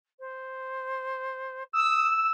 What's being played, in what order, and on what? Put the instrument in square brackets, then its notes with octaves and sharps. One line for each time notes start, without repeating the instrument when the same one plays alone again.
[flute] C5
[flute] D#6 [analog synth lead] E6